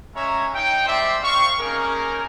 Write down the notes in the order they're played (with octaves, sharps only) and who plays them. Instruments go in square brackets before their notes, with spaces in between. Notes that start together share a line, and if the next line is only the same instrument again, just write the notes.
[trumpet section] G#3 C#4 C#5 E5 A#5
D#4 G5
G3 G#3 C4 C5 D5 E5
C4 F5 C#6
A#3 C#4 D#4 G#4 A#4